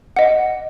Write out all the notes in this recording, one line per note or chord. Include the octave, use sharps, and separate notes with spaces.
D#5 F#5